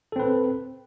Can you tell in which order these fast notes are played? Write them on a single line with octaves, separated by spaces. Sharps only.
A4 C4 B4